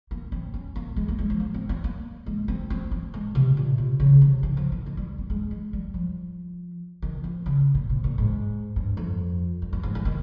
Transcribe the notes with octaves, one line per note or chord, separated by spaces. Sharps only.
A#3
C4
C#4
A#3
G#3
A#3
G#3
F3
A#3
C4
C4
A#3
G#3
C4
C4
C4
G#3
C3
A#2
C3
C#3
C3
D#3
F3
D#3
D#3
G3
C4
G#3
G#3
G3
F3
D#3
F3
C#3
A#2
C3
A#2
G#2
G2
F2
G2
G2
G#2
D#3
D#3